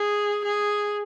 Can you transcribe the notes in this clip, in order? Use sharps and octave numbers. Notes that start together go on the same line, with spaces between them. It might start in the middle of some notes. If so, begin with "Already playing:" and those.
Already playing: G#4
G#4